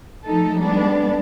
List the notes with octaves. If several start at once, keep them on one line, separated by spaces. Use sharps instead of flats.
F3 A3 D#4 A4
G3 G#3 B3 D4